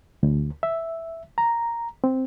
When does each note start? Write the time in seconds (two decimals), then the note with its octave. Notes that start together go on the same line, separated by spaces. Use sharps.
0.23 D2
0.63 E5
1.38 A#5
2.04 C4